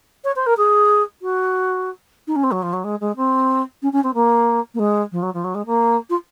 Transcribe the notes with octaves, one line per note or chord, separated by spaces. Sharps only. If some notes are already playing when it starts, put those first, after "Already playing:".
C#5
C5
A#4
G#4
F#4
D#4
C#4
C4
F#3
F3
F#3
G#3
G#3
C4
C#4
C#4
C4
A#3
A#3
G#3
F3
F#3
F3
F#3
G#3
A#3
F4